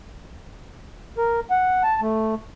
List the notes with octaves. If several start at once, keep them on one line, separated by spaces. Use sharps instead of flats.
A#4
F#5
A5
A3